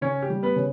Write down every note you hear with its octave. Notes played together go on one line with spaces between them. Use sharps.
C#3 C#4 C#5
G4
G3
B3 B4
C#3